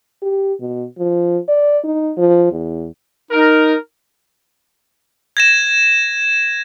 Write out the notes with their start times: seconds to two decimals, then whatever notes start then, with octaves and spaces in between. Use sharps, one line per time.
0.22 G4
0.60 B2
0.98 F3
1.48 D5
1.84 D#4
2.17 F3
2.52 E2
3.31 D#4 A#4
5.37 G#6 A#6 E7